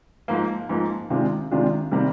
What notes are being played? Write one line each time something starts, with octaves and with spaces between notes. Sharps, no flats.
G#2 F3 A#3
G#2 F3 A#3
C3 D#3 G#3 D4 F4
C3 D#3 G#3 D4 F4
C3 D#3 G3 A#3